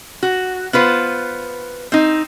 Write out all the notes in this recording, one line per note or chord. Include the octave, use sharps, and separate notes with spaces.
F#4
B3 F4 B4 C5
C4 D#4